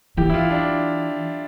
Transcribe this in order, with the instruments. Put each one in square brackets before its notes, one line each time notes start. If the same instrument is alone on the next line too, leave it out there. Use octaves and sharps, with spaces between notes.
[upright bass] E3 [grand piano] G4
[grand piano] E4
F4
D4